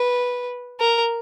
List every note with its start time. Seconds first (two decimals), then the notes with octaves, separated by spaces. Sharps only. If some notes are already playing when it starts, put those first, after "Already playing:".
Already playing: B4
0.80 A#4